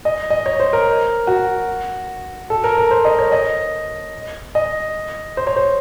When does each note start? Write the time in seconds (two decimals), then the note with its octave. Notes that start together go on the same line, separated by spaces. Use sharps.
0.05 D#5
0.30 D#5
0.46 C#5
0.60 C5
0.73 A#4
1.27 F#4
2.50 A4
2.64 A#4
2.78 A#4
2.91 C5
3.05 D#5
3.19 C#5
3.32 D#5
4.55 D#5
5.37 C5
5.47 C#5
5.56 C5